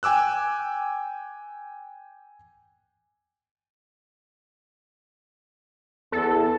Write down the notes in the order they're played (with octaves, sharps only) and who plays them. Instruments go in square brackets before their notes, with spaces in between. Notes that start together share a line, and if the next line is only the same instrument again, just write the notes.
[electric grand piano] G5 G#5 D6 E6 F#6
[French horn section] E2 [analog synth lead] A4